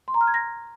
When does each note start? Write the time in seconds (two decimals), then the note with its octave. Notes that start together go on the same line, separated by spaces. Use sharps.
0.08 C6
0.14 A#5
0.21 F6
0.27 G#6
0.34 A#6